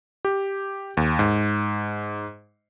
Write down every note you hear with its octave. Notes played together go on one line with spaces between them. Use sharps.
G4
D#2
G#2